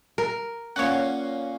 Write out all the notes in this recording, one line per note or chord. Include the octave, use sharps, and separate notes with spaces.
A#4
A#2 A#3 C#4 C#5 F#5